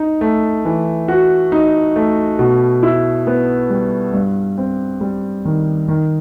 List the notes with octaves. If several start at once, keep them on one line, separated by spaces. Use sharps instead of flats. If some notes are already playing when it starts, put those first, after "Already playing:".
Already playing: D#4
A3
E3
F#4
D#4
A3
B2
E4
B3
G3
G2
C4
G3
D#3
D#3